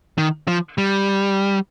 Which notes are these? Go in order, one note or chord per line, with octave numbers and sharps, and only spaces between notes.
D#3
F3
G3